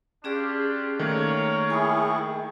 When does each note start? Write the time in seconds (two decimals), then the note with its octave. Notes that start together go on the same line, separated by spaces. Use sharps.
0.24 C#4 D4 F4 G4 G#4 D5
0.99 D#3 A3 A#3 A#4 C#5
1.70 E4 G#4 G5 C#6